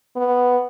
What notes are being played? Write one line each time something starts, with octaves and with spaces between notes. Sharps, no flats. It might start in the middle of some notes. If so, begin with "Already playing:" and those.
B3